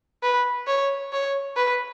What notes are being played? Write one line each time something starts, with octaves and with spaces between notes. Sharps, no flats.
B4
C#5
C#5
B4